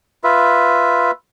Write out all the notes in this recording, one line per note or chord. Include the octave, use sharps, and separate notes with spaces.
F4 B4 E5